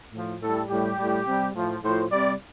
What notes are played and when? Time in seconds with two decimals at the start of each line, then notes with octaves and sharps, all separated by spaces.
0.13 A2 F3
0.42 A2 G3 A4
0.70 A2 G3 G4
0.98 A2 G3
1.26 C3 G3
1.55 A2 F3
1.84 A2 F3 C5
2.11 C3 G3 D5